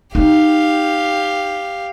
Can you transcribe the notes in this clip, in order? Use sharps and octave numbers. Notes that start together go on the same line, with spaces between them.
D#4 G4 F5